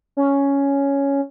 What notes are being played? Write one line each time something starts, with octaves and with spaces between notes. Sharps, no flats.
C#4